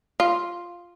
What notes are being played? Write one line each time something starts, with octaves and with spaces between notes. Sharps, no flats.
F4